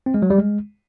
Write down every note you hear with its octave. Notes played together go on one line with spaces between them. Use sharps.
C4
G#3
F#3
G3
G#3